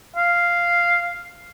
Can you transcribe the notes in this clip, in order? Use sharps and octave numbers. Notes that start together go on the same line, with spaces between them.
F5